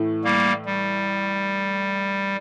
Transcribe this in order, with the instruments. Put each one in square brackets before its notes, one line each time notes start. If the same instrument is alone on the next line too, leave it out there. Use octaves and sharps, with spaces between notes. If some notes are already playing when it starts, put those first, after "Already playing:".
Already playing: [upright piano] A2 E3 A3
[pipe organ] G3 A#3
G3